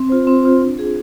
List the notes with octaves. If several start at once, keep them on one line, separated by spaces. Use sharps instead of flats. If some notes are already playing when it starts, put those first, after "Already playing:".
Already playing: C4
F4 C5
C4
F4 C5
D4
F4 G#4